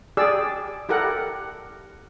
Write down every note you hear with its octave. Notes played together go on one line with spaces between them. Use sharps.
G4 G#4 D5 E6
E4 G4 A4 A#4 F#5